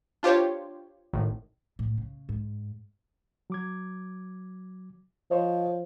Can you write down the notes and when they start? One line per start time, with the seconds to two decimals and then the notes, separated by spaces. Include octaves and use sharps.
0.23 D4 F4 G4 C5 C#5
1.13 G#1 A2
1.79 A2
1.97 C#3
2.29 G#2
3.50 F#3 D6 G#6
5.31 F3 C5 C#5 D#5